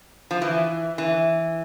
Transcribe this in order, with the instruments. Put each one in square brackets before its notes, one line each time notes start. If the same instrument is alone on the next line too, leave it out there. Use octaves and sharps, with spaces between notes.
[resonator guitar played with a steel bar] F3
E3
E3